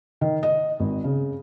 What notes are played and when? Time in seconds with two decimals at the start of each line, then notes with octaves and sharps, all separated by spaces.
0.21 D#3
0.43 D#5
0.80 G#1
1.04 C#3